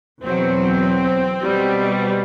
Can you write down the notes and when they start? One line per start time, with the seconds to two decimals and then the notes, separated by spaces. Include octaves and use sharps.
0.22 E2 B2 F#3 C4
1.42 B2 G3